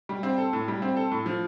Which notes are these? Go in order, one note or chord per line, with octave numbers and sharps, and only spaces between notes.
G3
C4
A4
A2
G3
C4
A4
A2
F3